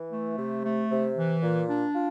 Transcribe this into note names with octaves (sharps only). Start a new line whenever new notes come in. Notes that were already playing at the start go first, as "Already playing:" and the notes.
Already playing: E3
A3
C3
A3
C3
E3
A#2
D4
F4